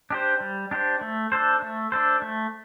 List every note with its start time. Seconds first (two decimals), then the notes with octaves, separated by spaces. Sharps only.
0.10 D4 G4 C5
0.40 G3
0.71 D4 G4 C5
1.01 A3
1.32 D4 A4 C5
1.62 A3
1.92 D4 A4 C5
2.22 A3